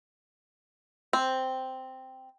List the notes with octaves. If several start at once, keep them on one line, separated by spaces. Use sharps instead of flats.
C4